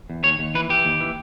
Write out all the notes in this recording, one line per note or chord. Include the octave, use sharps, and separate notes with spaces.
E2
D#2 C#5
D#2
E3 B4
E3 G4
D#2
E3